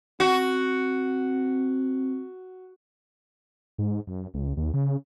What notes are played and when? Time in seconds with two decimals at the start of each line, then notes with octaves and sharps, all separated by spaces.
0.20 C4 F#4
3.78 G#2
4.07 F#2
4.34 C#2
4.57 D#2
4.74 C#3